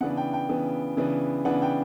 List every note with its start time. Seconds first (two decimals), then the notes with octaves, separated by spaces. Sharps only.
0.01 C#3 E3 B3 D4 F#5
0.17 G5
0.33 G5
0.49 C#3 E3 B3 D4
0.97 C#3 E3 B3 D4
1.45 C#3 E3 B3 D4 F#5
1.62 G5